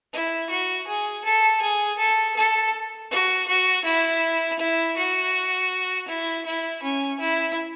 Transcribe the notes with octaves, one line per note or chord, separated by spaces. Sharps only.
E4
F#4
G#4
A4
G#4
A4
A4
F#4
F#4
E4
E4
F#4
E4
E4
C#4
E4